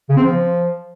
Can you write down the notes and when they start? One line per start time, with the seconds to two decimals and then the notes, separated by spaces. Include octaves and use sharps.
0.09 C#3
0.16 C4
0.23 F3